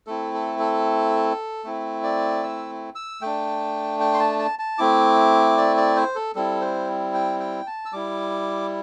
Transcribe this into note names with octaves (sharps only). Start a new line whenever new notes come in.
A3 C4 E4 A4
A4
A4
A3 C4 E4
D5
E6
E6
A3 D4 G5
G5
C6
A5
A5
A5
A3 C4 E4 D6
D5
D5
C5
A4
G3 C4 E4 A4
C5
G5
G5
A5
E6
G3 E4 D6